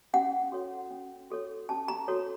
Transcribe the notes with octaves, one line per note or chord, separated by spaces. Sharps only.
C#4 F#5
F#4 A4 C#5
C#4
F#4 A4 C#5
C#4 A5
A#5
F#4 A4 C#5